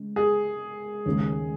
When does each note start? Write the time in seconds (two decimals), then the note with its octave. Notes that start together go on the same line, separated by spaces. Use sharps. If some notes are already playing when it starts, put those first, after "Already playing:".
Already playing: C#3 G#3
0.16 G#4
1.06 D#2 C#3 G#3 D#4